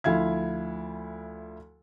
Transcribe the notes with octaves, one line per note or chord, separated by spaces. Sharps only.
D2 F3 E4 F5 G#6